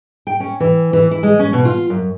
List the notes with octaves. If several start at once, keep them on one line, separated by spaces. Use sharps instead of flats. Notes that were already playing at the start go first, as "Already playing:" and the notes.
G5
C#4
E3
E3
E4
G#3
C#4
B2
F4
F#2